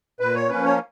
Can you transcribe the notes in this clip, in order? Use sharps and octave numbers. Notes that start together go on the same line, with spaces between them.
A#2 B4
C#5
F3 A#3 C#4 B4
C#5